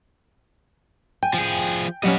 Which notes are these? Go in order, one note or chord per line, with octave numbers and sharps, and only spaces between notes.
G5 G#5
F3 G#4
F#3 G3 A#3 C#4 D#5 F5 F#5